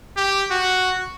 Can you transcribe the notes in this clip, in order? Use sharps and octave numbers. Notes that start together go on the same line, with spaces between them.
G4
F#4